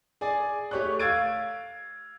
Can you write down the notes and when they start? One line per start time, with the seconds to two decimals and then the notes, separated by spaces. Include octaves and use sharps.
0.21 G#4 D5 G#5
0.71 A3 G4 C#5 C#6 F#6
0.99 F5 E6 G#6 A6 D7